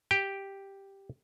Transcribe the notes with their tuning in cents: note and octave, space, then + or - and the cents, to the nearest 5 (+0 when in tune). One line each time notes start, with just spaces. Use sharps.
G4 +0 G5 +0